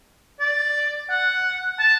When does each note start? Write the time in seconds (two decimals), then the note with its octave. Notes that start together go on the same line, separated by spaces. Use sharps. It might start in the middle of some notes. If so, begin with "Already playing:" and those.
0.40 D5
1.10 F#5
1.80 A5